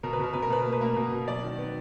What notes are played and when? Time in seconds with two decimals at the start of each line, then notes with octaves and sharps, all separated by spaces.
0.03 B2 A#4
0.13 B4
0.19 B2 A#4
0.33 B2 B4
0.42 A#4
0.50 B2 B4
0.62 A#3 A#4
0.72 B4
0.81 A#3 A#4
0.96 B2
1.12 B2
1.28 F#3 D5
1.43 D#3
1.59 B3